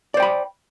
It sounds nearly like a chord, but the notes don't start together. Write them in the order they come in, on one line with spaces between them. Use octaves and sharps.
D5 C5 G5 B5